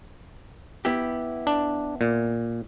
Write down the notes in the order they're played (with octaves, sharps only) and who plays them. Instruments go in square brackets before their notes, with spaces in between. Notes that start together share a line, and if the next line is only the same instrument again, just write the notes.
[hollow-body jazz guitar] B3 E4 G4
[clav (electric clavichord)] D4
A#2